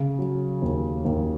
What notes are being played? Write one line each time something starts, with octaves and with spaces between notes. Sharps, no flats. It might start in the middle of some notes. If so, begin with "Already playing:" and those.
Already playing: C#3
F#3
D#2
D#2